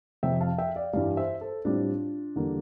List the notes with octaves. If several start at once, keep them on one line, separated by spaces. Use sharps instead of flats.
F2 C3 F3 E5 G5
F5 A5
E5 G5
D5 F5
G2 E3 G3 D5 F5
C5 E5
A4 C5
A2 G3 C4 D4 F4
E2 D3 G3 A#3